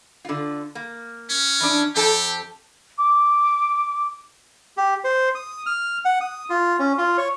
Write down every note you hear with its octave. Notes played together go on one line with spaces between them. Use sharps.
D3 F4
A#3
C#4
E3 D4
F2 G4 A4 A5
D6
G4
C5
D#6
F6
F#5
D#6
F4
C#4
F4
C#5